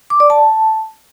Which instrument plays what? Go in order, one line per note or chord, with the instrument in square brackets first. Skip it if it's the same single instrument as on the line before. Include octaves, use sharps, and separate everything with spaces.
[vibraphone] D6
D5
A5